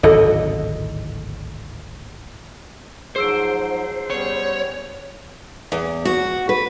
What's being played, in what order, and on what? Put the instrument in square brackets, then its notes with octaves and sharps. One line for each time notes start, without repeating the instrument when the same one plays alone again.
[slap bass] D1 G#1 B2 [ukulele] A4 D#5
[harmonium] G#2 F3 F#3 [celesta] G#4 E6 D7 [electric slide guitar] C5
[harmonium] G3 B3 C#4 [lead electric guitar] C#5
[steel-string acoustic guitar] E2
F#4
B4